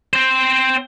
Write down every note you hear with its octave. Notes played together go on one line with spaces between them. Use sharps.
C4 C5